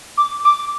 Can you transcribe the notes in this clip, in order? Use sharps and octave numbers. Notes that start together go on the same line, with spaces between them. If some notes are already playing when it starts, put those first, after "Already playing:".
D6
D6